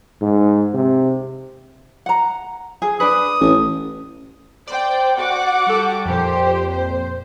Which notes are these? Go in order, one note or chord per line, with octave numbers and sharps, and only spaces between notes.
G#2
C3
F#5 A#5
G#4
D4 B4 D#6
A1
C5 D5 G5
F#4 F#5 D6
G3 A4
F2 A#2 G4 C5
C5